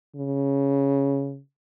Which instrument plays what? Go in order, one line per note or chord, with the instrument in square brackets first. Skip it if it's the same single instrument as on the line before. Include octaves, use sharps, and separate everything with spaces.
[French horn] C#3